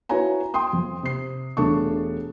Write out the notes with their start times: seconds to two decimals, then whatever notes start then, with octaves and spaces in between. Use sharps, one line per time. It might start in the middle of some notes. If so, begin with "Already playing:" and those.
0.09 E4 F#4 B4 C#5 G#5 A#5
0.54 G5 C6 D#6
0.73 F2
1.03 C3 C7
1.57 E1 A3 D4 A5 C#6